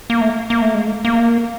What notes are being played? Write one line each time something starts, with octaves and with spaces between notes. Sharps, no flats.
A#3
A3
A#3
A3
G#3
A3
A#3